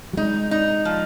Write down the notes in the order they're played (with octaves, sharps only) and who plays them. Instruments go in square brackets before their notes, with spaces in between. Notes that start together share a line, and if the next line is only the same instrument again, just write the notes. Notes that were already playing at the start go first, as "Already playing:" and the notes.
[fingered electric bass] F#3
[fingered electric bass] G#3 [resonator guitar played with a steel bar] D#4
[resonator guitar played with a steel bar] D#4
F3